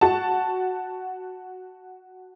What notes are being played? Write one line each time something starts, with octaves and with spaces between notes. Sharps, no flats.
F#4 F#5 A5